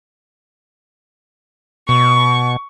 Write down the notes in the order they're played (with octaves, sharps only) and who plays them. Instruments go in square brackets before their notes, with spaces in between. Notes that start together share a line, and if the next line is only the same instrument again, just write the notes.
[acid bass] B2 [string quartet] C#6